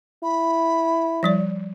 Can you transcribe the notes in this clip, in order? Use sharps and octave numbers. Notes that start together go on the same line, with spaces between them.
E4 B5
F3 G3 D5